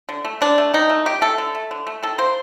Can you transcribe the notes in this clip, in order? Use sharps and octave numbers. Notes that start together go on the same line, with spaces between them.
D3
A3
D3 D4
A3
D#3 D#4
A3
D#3 G4
A3 A4
D3
A3
D3
A3
D#3 A4
A#3 C5